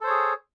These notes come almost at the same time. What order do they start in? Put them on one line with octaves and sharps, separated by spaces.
A4 C5 C#5 G#4